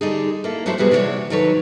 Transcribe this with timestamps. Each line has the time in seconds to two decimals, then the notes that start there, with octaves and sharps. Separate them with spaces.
0.01 D3 G3 D#4 G#4
0.44 A#3 E4 A4
0.66 F#3 A3 D4 E4 F#4 C5
0.78 C3 G3 B3 F#4 G#4
0.91 C3 E3 E4 F#4 C#5 D5
1.30 D#3 F#3 A4 B4 C#5